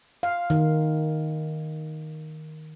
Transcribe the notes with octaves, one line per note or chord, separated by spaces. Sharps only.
F5
D#3